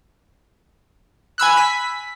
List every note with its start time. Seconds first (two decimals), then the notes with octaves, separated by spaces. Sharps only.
1.38 G#5 B5 E6 F#6
1.57 B6